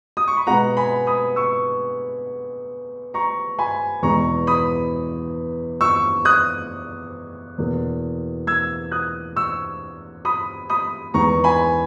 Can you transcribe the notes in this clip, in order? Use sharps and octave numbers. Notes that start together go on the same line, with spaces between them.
D#6
C#6
B5
B2 G#3 B3 F#5 A#5
G#5 B5
B5 D#6
C#6 E6
A#5 C#6
G#5 B5
E2 B2 G#3 B3 A#5 C#6
B5 D#6
C#6 E6
D#6 F#6
E2 B2 A#3
E6 G#6
D#6 F#6
C#6 E6
B5 D#6
B5 D#6
E2 D#3 G#3 B3 A#5 C#6
G#5 B5